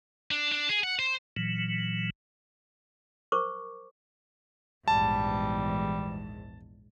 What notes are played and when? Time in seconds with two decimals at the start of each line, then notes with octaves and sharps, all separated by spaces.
0.31 D4
0.52 D4
0.69 G#4
0.84 F#5
0.99 C5
1.37 A#2 E3 F#3
3.32 A#4 C5 C#6 D6
4.88 A#1 E2 G#2 G3 A5